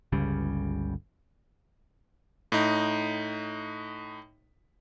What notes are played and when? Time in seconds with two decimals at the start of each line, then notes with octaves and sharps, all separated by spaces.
0.12 G1 C#2 C#3 G3
2.52 A2 D#4